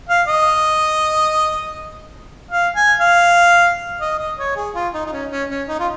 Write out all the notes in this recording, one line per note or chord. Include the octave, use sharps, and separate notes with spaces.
F5
D#5
F5
G#5
F5
D#5
D#5
C#5
G#4
F4
D#4
D#4
C#4
C#4
C#4
D#4
F4